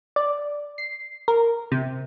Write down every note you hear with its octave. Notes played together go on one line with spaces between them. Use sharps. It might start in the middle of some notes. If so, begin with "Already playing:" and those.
D5
C7
A#4
C3